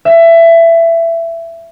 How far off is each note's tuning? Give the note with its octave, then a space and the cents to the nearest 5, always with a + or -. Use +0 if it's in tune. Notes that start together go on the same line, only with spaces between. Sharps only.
E5 +20